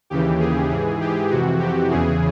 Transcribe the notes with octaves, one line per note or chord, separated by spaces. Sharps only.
D#2 C#3 E3 G4
G#4
G#2 E3
G4
F2 C3 E3 F#4
G4
E2 C#3 E3 G#4